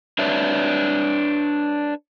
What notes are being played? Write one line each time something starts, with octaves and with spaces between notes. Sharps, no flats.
D4 B4 C#5 E5